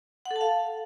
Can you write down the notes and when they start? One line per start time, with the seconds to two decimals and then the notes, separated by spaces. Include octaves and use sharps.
0.25 F#5
0.31 A4
0.36 A5
0.41 F5